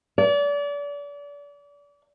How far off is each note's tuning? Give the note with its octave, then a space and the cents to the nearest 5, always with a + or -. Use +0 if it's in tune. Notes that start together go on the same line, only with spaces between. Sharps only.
D5 -35